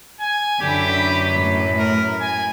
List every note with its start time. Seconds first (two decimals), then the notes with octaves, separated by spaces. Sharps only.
0.20 G#5
0.61 F#2 D3 E4 G4 B4
1.32 A2
1.79 A#4
2.20 G#5